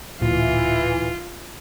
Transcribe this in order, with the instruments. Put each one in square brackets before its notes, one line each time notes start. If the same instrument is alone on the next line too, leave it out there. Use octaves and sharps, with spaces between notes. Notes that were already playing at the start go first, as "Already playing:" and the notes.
[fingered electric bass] D1 A#2 [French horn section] E3 [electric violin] F4